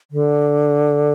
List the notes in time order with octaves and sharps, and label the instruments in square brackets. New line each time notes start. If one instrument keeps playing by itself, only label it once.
[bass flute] D3